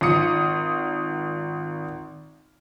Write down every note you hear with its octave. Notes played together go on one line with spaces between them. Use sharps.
G#1 F4 D#6 C#7